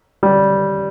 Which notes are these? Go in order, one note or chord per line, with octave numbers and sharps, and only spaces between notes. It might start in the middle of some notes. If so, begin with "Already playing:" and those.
G3